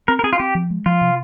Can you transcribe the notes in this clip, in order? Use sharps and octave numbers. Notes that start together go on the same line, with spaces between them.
C4 A#4
A#4
C4 G#4
F4
C4 G4
F3
G#3
F3 F4
C3